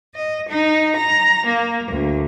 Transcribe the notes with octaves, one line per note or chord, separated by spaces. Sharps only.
D#5
D#4
A#5
A#3
D2